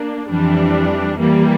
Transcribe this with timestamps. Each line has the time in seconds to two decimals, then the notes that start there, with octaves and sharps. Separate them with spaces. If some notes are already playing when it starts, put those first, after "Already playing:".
Already playing: A#3 D4
0.28 F2 E3 G3 D4
1.18 E3 G3 A#3